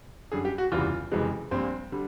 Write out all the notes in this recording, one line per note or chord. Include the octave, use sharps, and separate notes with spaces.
F#2 D3 G3 G#4
G4
F#4
F#1 E2 C3 E3 G3 F4
F#1 F2 C3 E3 G#3
A#1 A#2 G3 C4
D3 G3